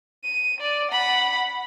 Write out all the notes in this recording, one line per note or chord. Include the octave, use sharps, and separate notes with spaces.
D#7
D5
F#5 B5